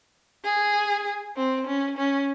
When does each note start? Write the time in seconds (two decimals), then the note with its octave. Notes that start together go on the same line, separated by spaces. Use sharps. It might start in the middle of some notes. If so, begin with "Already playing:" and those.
0.44 G#4
1.36 C4
1.67 C#4
1.97 C#4